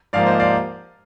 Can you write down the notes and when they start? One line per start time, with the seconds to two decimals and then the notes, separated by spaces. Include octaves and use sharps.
0.13 G#2 F3 A#3 D5 F5
0.26 C5 D#5
0.39 D5 F5